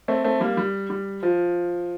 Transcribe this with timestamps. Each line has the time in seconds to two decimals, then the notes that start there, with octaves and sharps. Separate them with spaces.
0.08 A3 C4
0.24 A3 C4
0.40 G3 A#3
0.57 G3
0.90 G3
1.23 F3